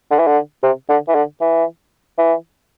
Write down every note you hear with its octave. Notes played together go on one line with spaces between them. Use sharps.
D3
E3
D3
C3
D3
E3
D3
E3
E3